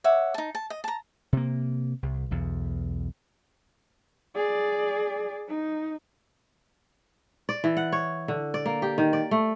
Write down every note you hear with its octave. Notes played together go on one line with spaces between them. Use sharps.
C#5 E5 F#5 D6
D#4 A5
A5
D#5
A5 A#5
C3 A#3
C2
B1 E2
G#4 D5
D#4
D5
E3
F#5
C#5
D3
D5
A#3
G4
D#3
D5
A3